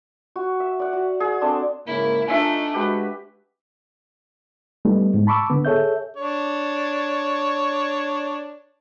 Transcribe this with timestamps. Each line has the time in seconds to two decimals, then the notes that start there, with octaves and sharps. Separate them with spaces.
0.36 F#4
0.60 E5
0.79 D5 F#5
0.93 F#4
1.20 G#4 F#5
1.41 C4 D4 A4 C6
1.87 G#2 C#3 A#3 E4
2.27 A3 D4 D#4 F4 E5 G#5
2.74 G#3 F#4 G4 B4
4.85 G3 A3 B3 D#4
5.14 G#2
5.27 A5 B5 C#6 D6 E6
5.50 D3 B3
5.65 G#4 A4 C#5 E5 G6
6.17 D4 C#5